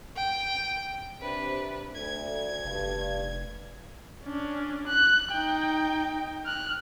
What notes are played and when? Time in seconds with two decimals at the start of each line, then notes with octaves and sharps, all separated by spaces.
0.16 G5
1.21 C3 D4 B4
1.94 D2 G#6
2.64 F1 G2
4.25 C#4 D4
4.87 F#6
5.31 D#4 G5
6.46 F6 F#6